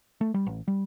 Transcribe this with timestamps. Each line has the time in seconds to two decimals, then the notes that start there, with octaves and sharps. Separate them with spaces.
0.21 A3
0.34 G3
0.46 A1
0.68 G3